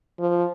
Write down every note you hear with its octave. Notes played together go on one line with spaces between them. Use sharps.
F3